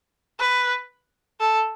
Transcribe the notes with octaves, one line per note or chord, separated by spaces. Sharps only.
B4
A4